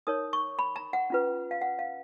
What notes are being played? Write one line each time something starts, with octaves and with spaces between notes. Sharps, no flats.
D#4 A#4 C#5 D#6
C#6
B5
A#5
F#5
C#4 F4 B4
F5
F#5
F5